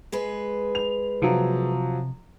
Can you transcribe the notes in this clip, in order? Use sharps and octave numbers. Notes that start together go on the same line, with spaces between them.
G#3 G#4 B4
F7
C3 F3 F#3